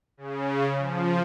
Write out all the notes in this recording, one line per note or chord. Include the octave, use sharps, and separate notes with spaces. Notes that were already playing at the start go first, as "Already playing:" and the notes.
C#3
F3